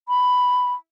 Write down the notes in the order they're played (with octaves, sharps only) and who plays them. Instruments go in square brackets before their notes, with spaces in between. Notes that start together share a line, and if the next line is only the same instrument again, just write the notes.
[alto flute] B5